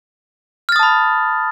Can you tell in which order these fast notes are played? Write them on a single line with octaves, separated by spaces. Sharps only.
F6 A6 D#6 A5 B5